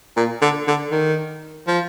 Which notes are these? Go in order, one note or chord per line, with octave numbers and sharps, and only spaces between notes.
A#2
D3
D3
D#3
F3